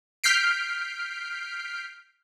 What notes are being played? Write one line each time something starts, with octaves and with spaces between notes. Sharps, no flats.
F6 G6 B6 C7 D7